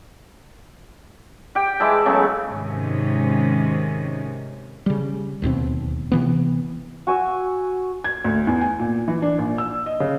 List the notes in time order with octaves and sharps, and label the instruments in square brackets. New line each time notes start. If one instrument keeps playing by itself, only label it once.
[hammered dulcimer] G4 G5
E3 G#3 E4 A5
C#3 F#3 A3 B3
[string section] G#2 C3 D#3 C#4
[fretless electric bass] C#3 G3
D1 D#2 B2 C4
C3 E3 B3
[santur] F#4 G#5 E6
[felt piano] G#6
D2
E2
G#5
A#2
E3
D4
A#1
E6
D#5
C#3